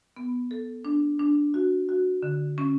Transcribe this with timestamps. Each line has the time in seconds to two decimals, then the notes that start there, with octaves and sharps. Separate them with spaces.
0.17 B3
0.51 A4
0.85 D4
1.20 D4
1.54 F#4
1.89 F#4
2.23 D3
2.58 C#4